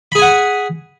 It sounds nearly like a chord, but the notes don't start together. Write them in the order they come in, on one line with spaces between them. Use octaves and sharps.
B5 G#4 G#5 F#5